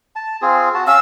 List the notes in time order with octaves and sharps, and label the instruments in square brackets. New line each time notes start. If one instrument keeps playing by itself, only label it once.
[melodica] A5
C4 F4 G#4
F#4 A5
[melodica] C#4 F5 [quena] E6